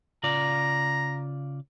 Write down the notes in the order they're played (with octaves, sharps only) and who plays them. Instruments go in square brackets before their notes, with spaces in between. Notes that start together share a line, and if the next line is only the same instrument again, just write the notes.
[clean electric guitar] C#3 F4 D5 [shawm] A#5